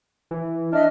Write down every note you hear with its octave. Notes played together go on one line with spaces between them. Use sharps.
E3
D4 D#5 E5 F6